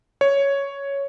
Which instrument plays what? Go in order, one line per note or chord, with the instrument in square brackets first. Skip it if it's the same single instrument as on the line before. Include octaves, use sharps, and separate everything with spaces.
[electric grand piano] C#5